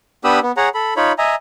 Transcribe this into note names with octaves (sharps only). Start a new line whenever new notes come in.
B3 D4 G4 B5 D#6 E6
B3
G#4 C#5 F#5 A#5
A4 B5
D#4 F4 C#5 B5
D#5 E5 G#5 A#5